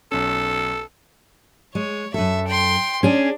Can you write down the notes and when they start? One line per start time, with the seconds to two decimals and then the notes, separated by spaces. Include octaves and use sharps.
0.12 B1 C#4 A4
1.75 G#3 C#5
2.14 F#2 A4 E5
2.48 G5 C6
3.03 C#4 D4 G#4